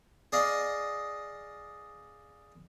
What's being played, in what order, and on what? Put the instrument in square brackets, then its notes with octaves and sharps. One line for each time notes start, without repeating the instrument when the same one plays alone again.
[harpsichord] G#4 D5 D#5 F5